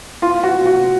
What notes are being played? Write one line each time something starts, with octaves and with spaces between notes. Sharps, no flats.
F4
F#4
F#4